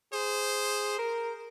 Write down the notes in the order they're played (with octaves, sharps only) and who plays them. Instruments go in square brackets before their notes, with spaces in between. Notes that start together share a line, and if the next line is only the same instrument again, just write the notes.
[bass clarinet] G#4 [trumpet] C5
[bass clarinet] A#4